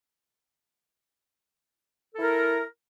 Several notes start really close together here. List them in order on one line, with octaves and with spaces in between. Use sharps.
A4 E4 A#4